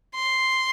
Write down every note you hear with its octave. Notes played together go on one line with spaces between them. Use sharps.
C6